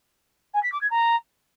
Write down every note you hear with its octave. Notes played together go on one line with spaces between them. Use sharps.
G#5
B6
D6
G#6
A#5